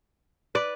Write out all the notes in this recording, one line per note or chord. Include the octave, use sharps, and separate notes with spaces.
B4 D5